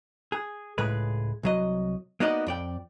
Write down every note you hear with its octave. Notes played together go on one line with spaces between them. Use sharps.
G#4
C#2 A2 G#3 G#4 B4
C2 F#3 D#5
A#3 B3 D#4 F#4 D5 D#5
F2 D5 G5